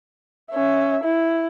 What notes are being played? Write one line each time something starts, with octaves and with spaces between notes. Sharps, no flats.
C#4 E5
E4